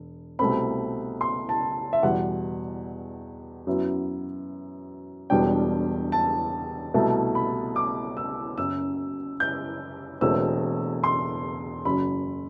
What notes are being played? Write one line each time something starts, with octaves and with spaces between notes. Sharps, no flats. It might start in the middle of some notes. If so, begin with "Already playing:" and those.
Already playing: E1
C2 B2 A3 C4 B5
C6
A5
E5
E2 B2 G3 F#5
F#2 F#3 B3 E4
E1 E2 B2 G3 D4 G5
A5
C2 B2 A3 E4 A5
B5
D6
E6
F#1 F#2 F#3 E6
G6
E1 E2 B2 A3 C4 E6
C6
F#1 F#2 F#3 B5